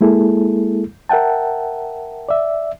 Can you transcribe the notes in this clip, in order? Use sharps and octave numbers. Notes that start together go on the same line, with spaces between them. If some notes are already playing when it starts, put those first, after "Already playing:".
G#3 A#3 E4 G#4 A4
A#4 E5 F#5 G5 A5
D5 E5